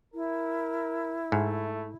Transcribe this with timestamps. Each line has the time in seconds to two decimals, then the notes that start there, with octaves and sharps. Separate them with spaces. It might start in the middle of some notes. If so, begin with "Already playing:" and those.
0.14 E4 A#4
1.32 G#2 A3